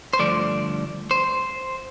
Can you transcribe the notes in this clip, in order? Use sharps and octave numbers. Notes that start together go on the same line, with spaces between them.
C5
G2 D3 F3 A3 D5
C5